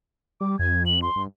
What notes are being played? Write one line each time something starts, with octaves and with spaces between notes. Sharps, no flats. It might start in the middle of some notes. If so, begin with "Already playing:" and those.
G3 D6
F2 G#6
F#7
C6
G2